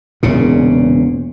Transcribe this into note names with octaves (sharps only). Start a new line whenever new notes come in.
E1 E2 A#2 C#3